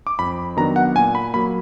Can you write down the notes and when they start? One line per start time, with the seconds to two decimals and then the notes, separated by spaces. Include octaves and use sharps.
0.07 D6
0.19 F2 B5
0.57 D#3 F#3 B3 D4 A#5
0.76 F#5
0.95 A#2 G#5
1.15 B5
1.34 F#3 A#3 B5